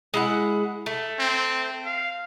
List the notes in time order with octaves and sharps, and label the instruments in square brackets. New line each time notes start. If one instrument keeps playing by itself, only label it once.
[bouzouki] G#3 E4 F#5
A3
[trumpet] C4
F5